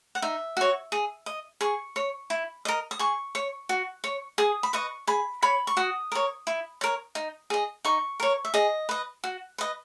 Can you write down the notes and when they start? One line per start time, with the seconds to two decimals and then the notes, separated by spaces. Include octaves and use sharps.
0.15 F#5
0.22 D#4 E5
0.57 F#4 C#5
0.92 G#4
1.26 D#5
1.61 G#4 C#6
1.96 C#5
2.30 E4
2.65 A#4 D#5
2.91 D#6
2.99 G#4 C#6
3.35 C#5
3.69 F#4
4.04 C#5
4.38 G#4 D#6
4.63 B5
4.73 B4 D#5 C#6
5.07 G#4 B5
5.42 C#5 B5
5.67 C#6
5.77 F#4 D#6
6.12 A#4 C#5
6.47 E4
6.81 A#4 C#5
7.15 D#4
7.50 G#4 D#5
7.85 D#4 C#6
8.20 A#4 C#5
8.45 E5
8.54 G#4 D#5
8.89 B4 D#5
9.24 F#4
9.58 B4 D#5